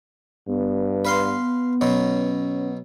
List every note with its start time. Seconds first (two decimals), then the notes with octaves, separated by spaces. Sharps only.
0.48 G2 B3
1.05 B4 F5 C6
1.81 B2 F#3 C#4